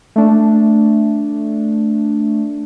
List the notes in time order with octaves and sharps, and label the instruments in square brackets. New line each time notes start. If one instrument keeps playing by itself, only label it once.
[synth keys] A3 D4